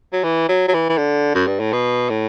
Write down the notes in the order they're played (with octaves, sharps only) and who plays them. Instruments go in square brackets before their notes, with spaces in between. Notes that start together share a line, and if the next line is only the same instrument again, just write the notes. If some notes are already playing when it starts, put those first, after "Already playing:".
[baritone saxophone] F#3
E3
F#3
F#3
E3
E3
D3
F#2
G2
A2
B2
A2